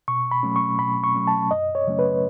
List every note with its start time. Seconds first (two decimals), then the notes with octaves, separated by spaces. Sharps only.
0.08 B2 C#6
0.31 B5
0.43 F#3 A3 C#4
0.56 C#6
0.79 B2 B5
1.04 C#6
1.15 F#3 A3 C#4
1.27 A5
1.51 F#2 D#5
1.75 C#5
1.87 C#3 F#3 A3 C#4
1.99 B4